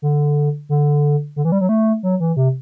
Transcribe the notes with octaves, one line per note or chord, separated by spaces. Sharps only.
D3
D3
D3
E3
G3
F#3
A3
F#3
E3
C3